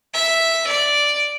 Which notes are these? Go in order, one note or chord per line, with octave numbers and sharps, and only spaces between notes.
E5
D5